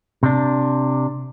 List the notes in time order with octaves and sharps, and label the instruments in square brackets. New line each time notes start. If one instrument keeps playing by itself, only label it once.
[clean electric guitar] C3 D4